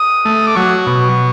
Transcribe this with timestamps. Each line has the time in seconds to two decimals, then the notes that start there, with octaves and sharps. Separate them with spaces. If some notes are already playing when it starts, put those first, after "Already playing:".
Already playing: D#6
0.25 A3
0.47 D6
0.55 F#3 C#6
0.87 B2